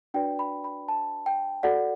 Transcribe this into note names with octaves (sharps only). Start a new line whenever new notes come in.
D4 F#4 B4 D5 G5
B5
B5
A5
G5
F#4 A4 D5 F#5